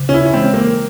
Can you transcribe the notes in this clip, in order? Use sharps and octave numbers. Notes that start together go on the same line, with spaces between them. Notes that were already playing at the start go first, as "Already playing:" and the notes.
Already playing: C#3
C#4
E4
C#4
E3 G#3 C4
A#3